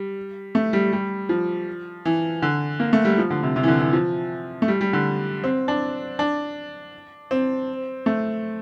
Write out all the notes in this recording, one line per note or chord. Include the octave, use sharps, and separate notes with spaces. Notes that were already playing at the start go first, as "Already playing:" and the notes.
Already playing: G3
A3
G3
G3
F3
E3
D3
A#3
A3
G3
F3
D3
C3
C3
E3
D3
E3
F3
A3
G3
G3
D3
C4
D4
D4
C4
A3